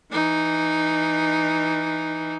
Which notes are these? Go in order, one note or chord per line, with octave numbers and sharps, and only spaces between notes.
E3 D#4